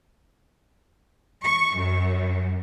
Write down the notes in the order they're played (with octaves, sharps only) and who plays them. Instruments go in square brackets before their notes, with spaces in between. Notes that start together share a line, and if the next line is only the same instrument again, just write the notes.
[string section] C#6
F#2